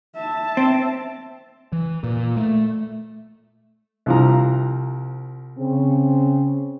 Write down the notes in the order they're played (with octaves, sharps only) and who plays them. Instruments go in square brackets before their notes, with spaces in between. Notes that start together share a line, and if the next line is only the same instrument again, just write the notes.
[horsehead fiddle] E5 A5
[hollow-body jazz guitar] C4
[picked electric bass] E3
A#2
A3
[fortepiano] C2 F3 A#5
[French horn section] C#3 C4